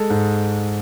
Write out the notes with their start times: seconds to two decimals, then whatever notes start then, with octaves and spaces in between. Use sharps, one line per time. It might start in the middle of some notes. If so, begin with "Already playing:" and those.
Already playing: G#3 A4
0.10 G#2